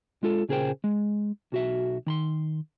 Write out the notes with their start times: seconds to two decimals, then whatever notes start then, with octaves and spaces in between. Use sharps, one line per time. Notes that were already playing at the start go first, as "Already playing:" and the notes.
0.23 G#3 F4 A4
0.49 A#2 C#3 G#4 A#4 C5 G5
0.84 G#3
1.52 B1 F#4 E5
2.06 D#3 B5 C6